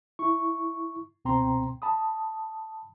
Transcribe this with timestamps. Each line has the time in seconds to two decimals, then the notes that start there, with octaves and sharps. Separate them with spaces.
0.19 E4 C#6
1.25 C#2 B2 C4 G5 A#5 C6
1.82 A5 B5 D#6